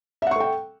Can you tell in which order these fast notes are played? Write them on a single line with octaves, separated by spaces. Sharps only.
E5 F#5 C#6 A4 G5